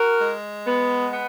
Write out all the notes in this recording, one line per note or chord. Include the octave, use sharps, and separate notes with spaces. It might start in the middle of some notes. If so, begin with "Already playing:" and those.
Already playing: F#4 A#4
G#3
B3
B3